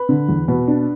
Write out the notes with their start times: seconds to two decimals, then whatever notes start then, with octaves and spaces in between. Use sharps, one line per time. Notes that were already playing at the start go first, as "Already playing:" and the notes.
Already playing: B4
0.09 D3
0.28 E2
0.48 B2 B4
0.68 D4